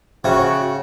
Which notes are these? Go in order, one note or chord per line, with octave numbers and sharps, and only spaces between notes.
C#3 F#4 C5 E5 G5